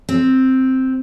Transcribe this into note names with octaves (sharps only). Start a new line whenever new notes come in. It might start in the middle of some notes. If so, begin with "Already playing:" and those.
C4